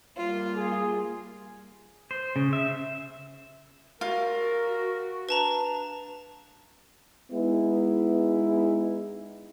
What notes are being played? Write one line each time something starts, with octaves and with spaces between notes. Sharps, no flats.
G3 A#3 F4
G#4
C5
C#3
E5
F4 F#4 A#4
D4 B4 A5 A#5
G#3 B3 D#4 E4